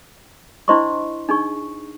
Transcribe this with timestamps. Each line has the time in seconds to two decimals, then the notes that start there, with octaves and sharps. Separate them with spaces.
0.68 D4 E4 C5 D#5 C6 C#6
1.29 D4 D#4 G#4 C#6